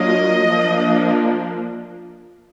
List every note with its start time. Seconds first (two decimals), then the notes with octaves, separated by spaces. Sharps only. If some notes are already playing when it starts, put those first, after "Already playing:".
Already playing: F#3 A#3 D4 F4 D#5
0.48 F3 A#3 D4